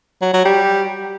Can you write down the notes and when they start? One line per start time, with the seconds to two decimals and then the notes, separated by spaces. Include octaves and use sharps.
0.22 F#3
0.34 F#3
0.45 G3